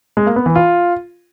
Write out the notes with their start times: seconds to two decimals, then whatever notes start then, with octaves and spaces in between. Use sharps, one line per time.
0.17 G#3
0.26 A#3
0.36 B3
0.46 E3
0.56 F4